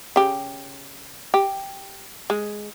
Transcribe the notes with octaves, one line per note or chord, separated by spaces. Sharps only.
C#3 G4
G4
G#3